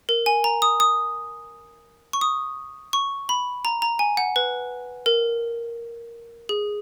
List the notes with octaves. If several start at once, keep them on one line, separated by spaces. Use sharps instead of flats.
A#4
G#5
A#5
D#6
D#6
C#6
D#6
C#6
B5
A#5
A#5
G#5
F#5
B4
A#4
G#4